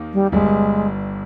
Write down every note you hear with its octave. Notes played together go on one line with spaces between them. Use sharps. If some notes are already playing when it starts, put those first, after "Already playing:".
Already playing: D#2 D#3 A#3 D#4
G3
G1 G2 G3 G#3